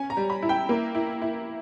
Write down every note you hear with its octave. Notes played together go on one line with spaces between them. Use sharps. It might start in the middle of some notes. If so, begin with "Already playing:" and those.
Already playing: C#4 G#5
A#5
G3
B5
E4
G5
A#3
E4
E4